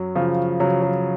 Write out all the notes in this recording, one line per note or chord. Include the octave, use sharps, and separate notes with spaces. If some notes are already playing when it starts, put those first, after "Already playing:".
Already playing: F#2 F#3
C#3 F3
C#3 F#3
F#3